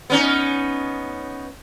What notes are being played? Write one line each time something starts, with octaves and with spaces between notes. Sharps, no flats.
B3 C#4 D#4